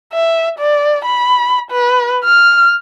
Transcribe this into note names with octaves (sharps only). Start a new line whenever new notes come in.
E5
D5
B5
B4
F6